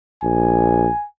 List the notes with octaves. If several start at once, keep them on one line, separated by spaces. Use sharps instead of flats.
A#1 G#5